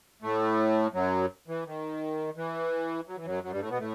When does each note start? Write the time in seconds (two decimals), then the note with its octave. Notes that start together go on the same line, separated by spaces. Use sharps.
0.22 A2 A3
0.94 F#2 F#3
1.48 E3
1.66 D#3
2.37 E3
3.07 F#3
3.17 E3
3.26 F#2 F#3
3.43 F#2 F#3
3.52 G2 G3
3.61 A2 A3
3.70 B2 B3
3.80 A2 A3